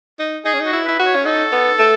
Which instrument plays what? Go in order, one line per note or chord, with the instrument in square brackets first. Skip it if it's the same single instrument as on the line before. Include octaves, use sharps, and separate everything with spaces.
[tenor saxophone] D#4
[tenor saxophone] D#4 [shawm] G#4
[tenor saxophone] C#4
D#4
[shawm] F#4
[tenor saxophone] E4
[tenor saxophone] E4 [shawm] B4
[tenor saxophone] F#4
[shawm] C#5
[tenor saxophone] C#4
[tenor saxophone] D#4 [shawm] A4
[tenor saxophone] B3
A3